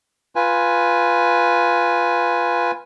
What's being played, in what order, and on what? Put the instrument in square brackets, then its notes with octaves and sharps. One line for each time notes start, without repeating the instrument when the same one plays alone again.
[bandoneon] F4 B4 G#5